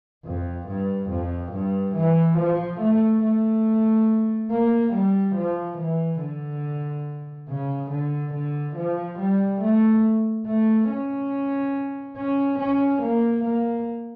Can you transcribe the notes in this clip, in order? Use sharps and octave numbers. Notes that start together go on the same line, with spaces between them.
F2
G2
F2
G2
E3
F3
A3
A3
A#3
G3
F3
E3
D3
C#3
D3
D3
F3
G3
A3
A3
C#4
C#4
C#4
A#3
A#3